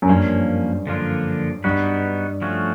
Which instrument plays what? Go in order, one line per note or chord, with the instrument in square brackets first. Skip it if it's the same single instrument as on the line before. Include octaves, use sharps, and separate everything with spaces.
[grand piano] F#2
[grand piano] G2 [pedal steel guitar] F3 A#3 C#4
[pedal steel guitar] D3 F3 A#3 D4 F4
[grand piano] G2 [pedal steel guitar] G3 B3 D#4 F#4 B4
[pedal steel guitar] F3 A3 C#4 F#4